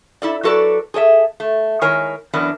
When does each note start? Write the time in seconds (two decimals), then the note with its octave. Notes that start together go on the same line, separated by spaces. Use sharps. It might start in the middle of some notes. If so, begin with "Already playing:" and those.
0.22 E4 A4 D5
0.43 F#3 F#4 A4 B4 D5
0.94 G#4 A4 D5 E5
1.40 A3
1.81 D#3 G#3 E4 A#4 C#5 G#5
2.33 F#2 E3 B3 D4 A#4